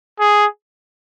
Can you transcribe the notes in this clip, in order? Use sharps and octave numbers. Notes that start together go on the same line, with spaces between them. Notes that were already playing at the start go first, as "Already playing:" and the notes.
G#4